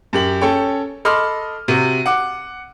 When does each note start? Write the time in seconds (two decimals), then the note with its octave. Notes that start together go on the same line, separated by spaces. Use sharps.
0.13 F#2 G4 F#7
0.41 C#4 A4 C#5 G5
1.05 A4 D#5 B5 C6 D6 F6
1.68 C3 F#4
2.06 F#5 D6